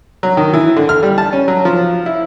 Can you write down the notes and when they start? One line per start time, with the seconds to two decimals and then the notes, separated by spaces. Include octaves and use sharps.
0.23 F#3
0.37 D#3
0.53 E3
0.76 D3
0.89 F6
1.03 G3
1.18 A5
1.33 C#4
1.48 F#3
1.65 F3
2.06 E4